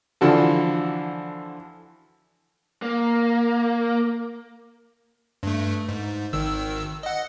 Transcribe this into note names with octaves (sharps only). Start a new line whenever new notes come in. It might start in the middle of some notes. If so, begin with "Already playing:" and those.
D3 E3 F3 F#4 A4
A#3
G2 A3
G#2
G#1 D#3 E6
D#5 F#5